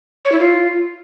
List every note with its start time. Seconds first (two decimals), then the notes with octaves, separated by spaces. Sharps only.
0.25 C#5
0.32 E4
0.39 F4